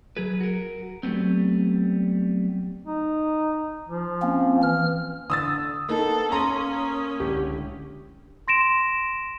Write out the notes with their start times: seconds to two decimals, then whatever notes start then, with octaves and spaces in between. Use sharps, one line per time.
0.17 F#3 G#4 B4
0.40 F#4 A#4
1.03 F#3 G3 A3 B3 C4
2.87 D#4
3.88 F3
4.22 A#3 C4 C#4
4.63 E3 F6
5.30 D3 D#6 E6 A6
5.89 A#3 B3 D#4 A4
6.32 A#3 C#4 A#5 C6 D#6 A#6
7.20 C#2 A2 D3 G4
8.48 C6 A#6 D7 E7